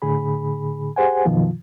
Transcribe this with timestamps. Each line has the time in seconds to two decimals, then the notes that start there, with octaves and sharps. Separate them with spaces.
0.02 A2 D3 G#4 B5
0.96 G4 G#4 C5 F#5 G#5
1.25 F#2 B2 D#3 F3 F4